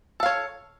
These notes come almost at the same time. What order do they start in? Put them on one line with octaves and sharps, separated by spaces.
A4 F5 C#5